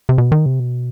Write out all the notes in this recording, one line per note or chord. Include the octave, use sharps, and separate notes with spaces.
C3
B2
D#3
C3
B2